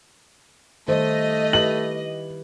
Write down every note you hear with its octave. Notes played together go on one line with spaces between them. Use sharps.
D#3 G3 A3 C5 D#5
E4 G4 B4 F#7